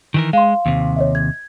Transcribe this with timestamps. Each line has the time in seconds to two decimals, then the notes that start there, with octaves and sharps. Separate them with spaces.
0.14 D#3 E3 A#4
0.33 G#3 F5 C6
0.66 D#2 C3
0.96 C#5 D#5 E5
1.15 G#6